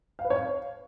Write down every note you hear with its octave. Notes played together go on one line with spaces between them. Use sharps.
F5
B4
C#5
F5